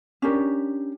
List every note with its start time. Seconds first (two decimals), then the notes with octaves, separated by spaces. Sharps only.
0.22 C#4 D4 G4 A#4